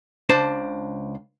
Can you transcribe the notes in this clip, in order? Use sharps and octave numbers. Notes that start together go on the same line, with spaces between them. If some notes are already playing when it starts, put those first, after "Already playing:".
C#2 D4 C5 A5